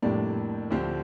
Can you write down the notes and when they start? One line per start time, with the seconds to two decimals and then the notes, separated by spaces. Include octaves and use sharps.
0.02 F2 A2 C3 G3 A#3 D4
0.71 D2 D3 F3 C4 G4